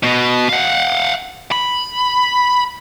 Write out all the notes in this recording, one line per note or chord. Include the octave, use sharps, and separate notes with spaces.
B2
F5 F#5
B5